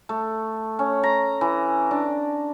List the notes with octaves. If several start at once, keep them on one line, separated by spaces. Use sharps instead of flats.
A3
C#4
A#5
E3
D4